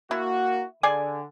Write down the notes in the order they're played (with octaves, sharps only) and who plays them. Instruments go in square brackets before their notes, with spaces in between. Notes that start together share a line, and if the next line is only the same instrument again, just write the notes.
[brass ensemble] A#3 F#4 [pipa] E4
[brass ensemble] D3 [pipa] G#4 D5 G#5